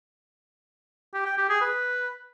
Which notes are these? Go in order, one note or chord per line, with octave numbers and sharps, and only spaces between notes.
G4
G5
G4
G#4
B4